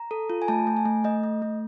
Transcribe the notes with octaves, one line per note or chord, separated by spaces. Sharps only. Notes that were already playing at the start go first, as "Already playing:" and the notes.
Already playing: A#5
A4
F4
G#5
A3 A5
A3
G#5
A3
A3 D#5
A3
A3